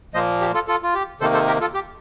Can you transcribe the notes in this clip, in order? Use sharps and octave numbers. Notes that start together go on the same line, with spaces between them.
A#2 F3 A#3 C5 D#5
G4
F4 A4
F4 A4
F4
G4
C3 D#3 A#3 A4 C5
A4 C5
G4 A#4
F4 A4
G4